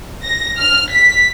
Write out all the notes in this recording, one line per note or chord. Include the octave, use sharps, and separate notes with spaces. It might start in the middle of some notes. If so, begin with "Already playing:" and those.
A#6
F6
B6